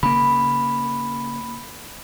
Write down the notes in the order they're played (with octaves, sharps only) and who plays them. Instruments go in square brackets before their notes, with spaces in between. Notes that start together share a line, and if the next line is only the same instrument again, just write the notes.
[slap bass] C#3 A#3 [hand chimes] B5